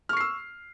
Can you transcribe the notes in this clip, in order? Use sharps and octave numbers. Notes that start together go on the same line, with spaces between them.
C#6 E6 F6 C7